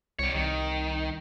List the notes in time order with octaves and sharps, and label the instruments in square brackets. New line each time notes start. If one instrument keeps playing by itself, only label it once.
[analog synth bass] C2 [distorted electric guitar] G3 C#5
[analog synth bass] C2 [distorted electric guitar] D#3